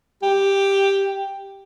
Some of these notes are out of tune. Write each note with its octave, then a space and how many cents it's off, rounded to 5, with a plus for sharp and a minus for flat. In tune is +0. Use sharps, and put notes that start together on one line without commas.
G4 +5